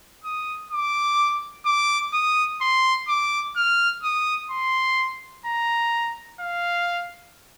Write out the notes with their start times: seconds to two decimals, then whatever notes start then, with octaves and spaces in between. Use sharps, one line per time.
0.24 D#6
0.71 D6
1.66 D6
2.14 D#6
2.61 C6
3.09 D6
3.56 F6
4.03 D#6
4.51 C6
5.46 A#5
6.41 F5